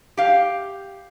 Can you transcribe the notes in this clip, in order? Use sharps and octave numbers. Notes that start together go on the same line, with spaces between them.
G4 F5